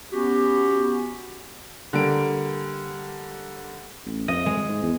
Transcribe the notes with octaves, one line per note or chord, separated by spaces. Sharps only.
B3 C#4 F#4 G4
D3 G3 A#3 D7
A1
F2 D#5
G#3
G#2
E2